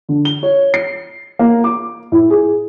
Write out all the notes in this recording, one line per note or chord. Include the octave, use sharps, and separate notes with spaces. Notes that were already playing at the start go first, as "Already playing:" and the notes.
D3
G7
C#5
C7
A#3
D6
A2
G#4